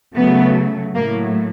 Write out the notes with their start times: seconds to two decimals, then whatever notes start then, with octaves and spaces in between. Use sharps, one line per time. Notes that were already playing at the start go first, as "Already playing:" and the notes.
0.15 C#3 F#3 A3 B3
0.94 A2 F#3 A3 A#3